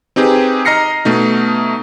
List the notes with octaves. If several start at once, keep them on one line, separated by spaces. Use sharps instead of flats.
C4 D#4 G4 G#4 B4
D#5 A#5 F6 A#6 C7 C#7
B2 A3 D#4